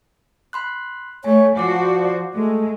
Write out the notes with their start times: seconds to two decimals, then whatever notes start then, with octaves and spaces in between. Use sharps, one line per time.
0.53 B5 C6 F#6
1.24 A3 C#5 G#5
1.57 F3 F#4 C5 D5 F#5 D6
2.34 G#3 A3